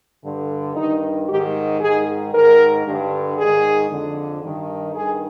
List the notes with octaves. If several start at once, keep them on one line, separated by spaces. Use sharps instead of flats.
G2 D3
G2 D#3 D#4
G#2 D#3 G4
G#2 D#3 G#4
G#2 D#3 A#4
G2 D3
G#2 D#3 G#4
F2 D3
G2 D#3
G2 D#3 G#4